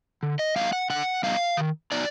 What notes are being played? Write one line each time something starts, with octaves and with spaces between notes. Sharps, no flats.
D3
D#5
G3 B3 D#4 F5
F#5
D3 F#5
G3 B3 D#4 F5
D#3
F#3 B3 D#4 D5